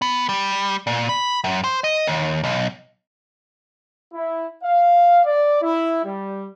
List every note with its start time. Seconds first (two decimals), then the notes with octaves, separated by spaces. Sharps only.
0.02 B3
0.29 G3
0.87 A#2
1.09 B5
1.44 F#2
1.64 C5
1.84 D#5
2.07 D#2
2.44 B1
4.14 E4
4.64 F5
5.25 D5
5.62 E4
6.05 G3